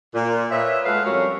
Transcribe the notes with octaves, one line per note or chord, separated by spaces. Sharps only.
A#2
F4 B4 C#5 D#5 E5
G#3 A3 F#4 A4 B4 F5
F2 G3 C#4 F#4 A#4 C#5